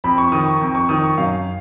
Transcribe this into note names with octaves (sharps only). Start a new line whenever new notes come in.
F2 B5
C#6
D#3 D#6
C#6
F2
C#6
D#3 D#6
C#6
F#2 F5